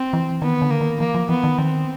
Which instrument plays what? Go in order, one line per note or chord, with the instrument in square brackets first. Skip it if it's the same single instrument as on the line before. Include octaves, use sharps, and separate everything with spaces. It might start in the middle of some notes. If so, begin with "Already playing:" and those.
Already playing: [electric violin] C4
[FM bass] E3
[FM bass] D#3 [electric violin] B3
[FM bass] D3
[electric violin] A#3
[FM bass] D#3
[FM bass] E3 [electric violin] A#3
[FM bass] F3
[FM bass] E3 [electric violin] B3
[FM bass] D#3
[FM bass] D#3 [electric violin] C4